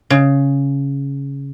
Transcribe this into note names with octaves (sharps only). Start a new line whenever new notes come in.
C#3